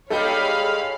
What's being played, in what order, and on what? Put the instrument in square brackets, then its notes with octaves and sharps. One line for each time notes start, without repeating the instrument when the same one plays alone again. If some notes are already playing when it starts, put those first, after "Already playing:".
[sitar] G3 G#3 D#4 [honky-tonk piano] G4 A4 [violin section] C#5 B5 [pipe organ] F5